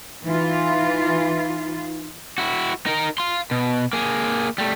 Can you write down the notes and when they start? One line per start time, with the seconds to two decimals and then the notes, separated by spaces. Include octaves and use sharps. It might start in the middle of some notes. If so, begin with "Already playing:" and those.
0.25 E3 D#4 F4
2.38 E4 F#4
2.86 D#4 A#4
3.18 F5 C6
3.51 B2
3.93 A#3 G#4
4.58 G3 A3